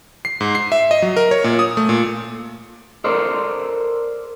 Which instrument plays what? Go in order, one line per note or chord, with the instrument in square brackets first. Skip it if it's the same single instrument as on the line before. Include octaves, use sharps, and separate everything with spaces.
[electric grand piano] C7
G#2
C7
E5
D#5
F#3
A#4
C#5
A#2
D#6
A3
A#2
[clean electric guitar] A4 A#4 C5 D5